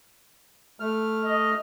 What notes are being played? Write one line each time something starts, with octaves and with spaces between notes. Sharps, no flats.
A3 F6
D#5